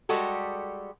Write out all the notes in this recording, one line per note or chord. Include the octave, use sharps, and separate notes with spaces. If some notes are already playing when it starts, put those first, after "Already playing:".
G3 G#3 F#4 G4 A4